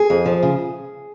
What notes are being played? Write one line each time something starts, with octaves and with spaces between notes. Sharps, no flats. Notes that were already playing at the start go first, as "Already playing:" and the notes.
Already playing: G#4
F2
F3
C#3